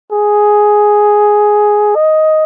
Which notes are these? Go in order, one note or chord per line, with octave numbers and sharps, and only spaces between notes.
G#4
D#5